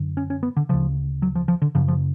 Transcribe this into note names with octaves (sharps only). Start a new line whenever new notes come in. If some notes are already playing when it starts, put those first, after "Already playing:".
Already playing: F#2 D3
C#4
C#4
B3
D3
D2 C#3 F3
F#3
F3
F3
D3
F#2 C#3 F3
F3